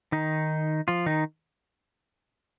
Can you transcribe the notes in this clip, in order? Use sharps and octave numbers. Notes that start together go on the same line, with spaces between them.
D#3 D#4
F3 F4
D#3 D#4